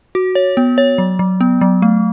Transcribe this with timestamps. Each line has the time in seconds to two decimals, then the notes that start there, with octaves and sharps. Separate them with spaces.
0.15 F#4
0.35 C#5
0.57 B3
0.78 C#5
0.98 F#3
1.19 F#3
1.41 B3
1.61 F#3
1.82 A3